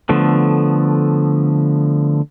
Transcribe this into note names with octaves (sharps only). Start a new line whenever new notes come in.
D3 F3 A3 B3